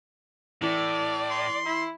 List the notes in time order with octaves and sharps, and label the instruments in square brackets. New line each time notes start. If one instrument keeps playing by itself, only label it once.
[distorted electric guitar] A2 [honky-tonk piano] E3 [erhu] D5
[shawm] C6
[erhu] E4